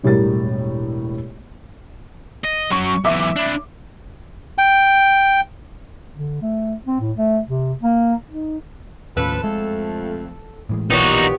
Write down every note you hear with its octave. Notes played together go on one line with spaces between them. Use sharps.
E1 A2 G3 G4 A#4 A6
D#5
F#3 C#4 C#6
B1 E3 E5 D6
D4 E4
G5
D3
A3
C4
A2
A3
C3
A#3
D#4
D#2 A2 F3 C#4 A4 B4
F2 G#3 A3
A2 E3 G#3
B1 A#2 E3 B3 D#4 F#4 G4 C#5